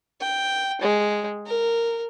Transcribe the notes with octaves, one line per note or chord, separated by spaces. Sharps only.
G5
G#3
A#4